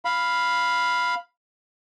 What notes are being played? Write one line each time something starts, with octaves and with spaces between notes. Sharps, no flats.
F5 B5